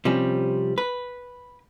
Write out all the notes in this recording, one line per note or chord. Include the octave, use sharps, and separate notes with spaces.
C3 F3 G3 C#4
B4